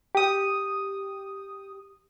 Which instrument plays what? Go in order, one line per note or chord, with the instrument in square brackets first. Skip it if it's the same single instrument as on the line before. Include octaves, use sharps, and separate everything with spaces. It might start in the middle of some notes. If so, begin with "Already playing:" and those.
[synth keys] G4 D#6